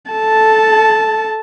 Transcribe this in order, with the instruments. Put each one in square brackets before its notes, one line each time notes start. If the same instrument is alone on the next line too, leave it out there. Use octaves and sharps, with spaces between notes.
[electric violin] A4 A5